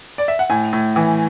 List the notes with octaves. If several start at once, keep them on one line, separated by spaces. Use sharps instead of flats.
D5
E5
F#5
A2 G#5
A2
E3